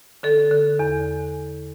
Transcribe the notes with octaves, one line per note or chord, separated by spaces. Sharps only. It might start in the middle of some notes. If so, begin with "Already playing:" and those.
D3 A4
D3
E2